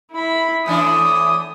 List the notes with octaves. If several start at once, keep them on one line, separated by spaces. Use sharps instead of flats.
E4 B5
A2 E3 D4 D#6